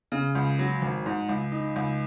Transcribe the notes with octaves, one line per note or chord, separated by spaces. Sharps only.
C#3
C#2
F#3
G#1
G#2
C#2
D#4
C#2